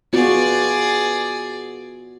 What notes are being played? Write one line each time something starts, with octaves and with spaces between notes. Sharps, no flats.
B3 F4 F#4 G#4 D5